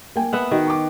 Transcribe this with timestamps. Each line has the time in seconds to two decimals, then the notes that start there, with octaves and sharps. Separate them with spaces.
0.16 A#3 G5 G#5
0.33 B3 E5 F#5
0.51 D#3 F#4
0.67 C#6 D6